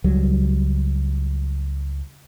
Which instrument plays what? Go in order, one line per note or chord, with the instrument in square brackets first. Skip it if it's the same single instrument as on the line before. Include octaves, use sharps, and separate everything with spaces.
[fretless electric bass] C#2 F#3 G3